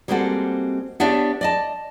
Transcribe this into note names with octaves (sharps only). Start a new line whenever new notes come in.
G3 G#3 A#3 C4 F#4 A4
B3 D4 G4 C#5 D5 E5
D5 D#5 A5